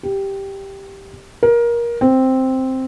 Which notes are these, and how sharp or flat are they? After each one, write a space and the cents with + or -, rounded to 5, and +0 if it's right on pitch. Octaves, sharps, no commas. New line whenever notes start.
G4 +0
A#4 +20
C4 +0